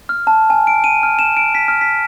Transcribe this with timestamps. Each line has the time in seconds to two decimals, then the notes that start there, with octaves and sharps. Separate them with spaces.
0.09 F6
0.27 A5
0.50 G#5
0.67 D7
0.84 D#7
1.03 F6
1.19 E7
1.37 D7
1.55 B6
1.68 F6
1.81 B6